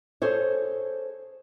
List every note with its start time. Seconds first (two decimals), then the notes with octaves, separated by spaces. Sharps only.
0.22 G#4 A4 C5 C#5